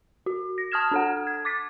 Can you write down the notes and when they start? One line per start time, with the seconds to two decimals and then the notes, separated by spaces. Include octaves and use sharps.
0.26 F#4
0.58 A#6
0.72 A5 D#6 F6 G#6 E7
0.91 D4 A4 F#5
1.27 G#6
1.45 D6 A6 B6